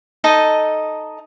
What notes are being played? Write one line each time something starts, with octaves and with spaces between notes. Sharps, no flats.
D#4 A4 D#5 A5